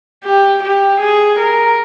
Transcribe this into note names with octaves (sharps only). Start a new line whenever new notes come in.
G4
G4
G#4
A#4